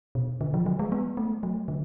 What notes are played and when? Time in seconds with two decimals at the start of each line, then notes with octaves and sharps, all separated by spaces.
0.15 B2
0.41 D3
0.54 F3
0.66 F#3
0.79 G#3
0.92 B3
1.17 A3
1.43 F#3
1.68 D3